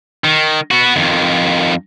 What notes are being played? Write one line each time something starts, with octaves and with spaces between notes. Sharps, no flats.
D#3
B3 F#4
F2 D#3